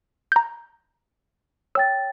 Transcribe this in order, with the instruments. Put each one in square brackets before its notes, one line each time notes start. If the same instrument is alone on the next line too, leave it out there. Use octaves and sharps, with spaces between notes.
[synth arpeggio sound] A#5 G6
[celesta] C#5 G5 A6 [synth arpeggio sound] E6